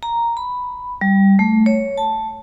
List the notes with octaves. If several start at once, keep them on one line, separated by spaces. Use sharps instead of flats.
A#5
B5
G3
A3
C#5
A5